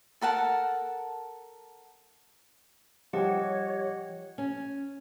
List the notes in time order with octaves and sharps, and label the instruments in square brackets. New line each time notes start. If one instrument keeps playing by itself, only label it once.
[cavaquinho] A4 A#4 F#5 A5
[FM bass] F3 [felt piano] G3 G5 [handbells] G4 D#5 F#5 [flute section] C#5
[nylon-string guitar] C#4